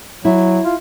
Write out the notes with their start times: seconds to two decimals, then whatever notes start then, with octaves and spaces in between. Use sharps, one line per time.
0.25 F#3 E4
0.65 F4